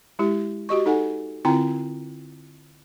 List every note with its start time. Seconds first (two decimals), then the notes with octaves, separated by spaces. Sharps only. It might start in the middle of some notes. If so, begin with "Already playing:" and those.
0.19 G#3 E4 G4
0.69 F#4 G4 D#5 C#6
0.86 D#4 A4 F#5 G#5
1.45 D3 C4 E4 F4 G5 A#5